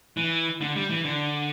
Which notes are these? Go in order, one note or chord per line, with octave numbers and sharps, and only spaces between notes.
E3
D3
G3
E3
D3